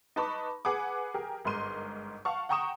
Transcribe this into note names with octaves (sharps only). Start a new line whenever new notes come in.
D#4 B4 A5 B5 C#6 D6
G#4 B4 F#5 D6
G4 G#4 A#4
G1 G#2 A#4 C6 D#7
F5 F#5 A5 C#6
F#5 G5 A#5 C#6 D#6 E7